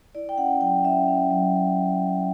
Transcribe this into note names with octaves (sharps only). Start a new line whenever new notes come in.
E4 D5
G5
C#4 F#5
F#3 G5
C#4 E5
C#4
F#3